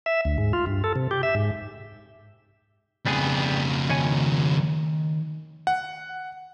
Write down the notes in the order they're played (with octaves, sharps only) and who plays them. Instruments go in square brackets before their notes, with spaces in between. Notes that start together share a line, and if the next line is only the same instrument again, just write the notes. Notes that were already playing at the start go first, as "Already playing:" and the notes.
[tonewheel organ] E5
D2
G#2
F4
G2
A4
C3
G4
E5
G#2
[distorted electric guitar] F2 C#3 [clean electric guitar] G3 B3 G#4
[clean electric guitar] D#3 C#5 G#5
[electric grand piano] F#5